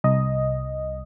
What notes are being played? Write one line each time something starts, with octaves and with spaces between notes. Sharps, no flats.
C2 D#5